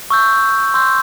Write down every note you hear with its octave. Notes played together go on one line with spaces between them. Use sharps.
C#6 E6 G6
C6 E6 G6